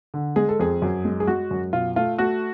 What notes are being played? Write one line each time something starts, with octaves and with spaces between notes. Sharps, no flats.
D3
G#3 G#4
A4
F2 G#4
F#2
G#3
G#4
G#3 F#4
F#2
B2 F4
A3 F4
A3 F#4